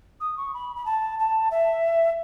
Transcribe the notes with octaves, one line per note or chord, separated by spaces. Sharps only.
D#6
C#6
B5
B5
A5
A5
E5